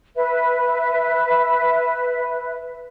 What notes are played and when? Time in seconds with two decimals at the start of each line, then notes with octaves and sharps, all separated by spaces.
0.15 B4 E5